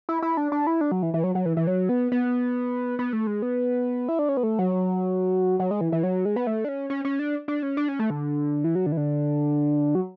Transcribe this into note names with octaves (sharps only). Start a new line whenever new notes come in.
E4
E4
D4
D4
E4
D4
F#3
E3
E3
F#3
F#3
E3
E3
F#3
B3
B3
B3
A3
G#3
B3
E4
D4
C#4
B3
A3
F#3
F#3
G#3
E3
E3
F#3
G#3
B3
A3
D4
C#4
C#4
C#4
D4
D4
C#4
D4
C#4
A3
D3
E3
F#3
D3
E3
D3
F#3